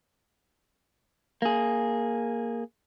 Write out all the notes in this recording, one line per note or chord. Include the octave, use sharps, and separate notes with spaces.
A#3 G#4